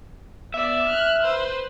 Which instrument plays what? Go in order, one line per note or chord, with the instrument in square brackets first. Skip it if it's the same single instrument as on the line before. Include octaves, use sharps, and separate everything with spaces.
[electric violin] B3 D5 [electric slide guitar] E5
[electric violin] F6 F#6
B4 C5